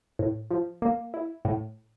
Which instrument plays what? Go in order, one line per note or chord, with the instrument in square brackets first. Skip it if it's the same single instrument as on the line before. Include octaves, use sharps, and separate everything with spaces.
[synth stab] A2
F3
A#3
E4
A2